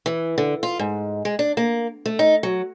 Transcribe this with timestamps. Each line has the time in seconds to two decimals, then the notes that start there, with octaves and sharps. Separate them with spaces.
0.06 E3
0.38 D3
0.63 F4
0.79 G#2
1.25 G#3
1.39 D4
1.57 A#3
2.06 A3
2.19 D#4
2.43 F#3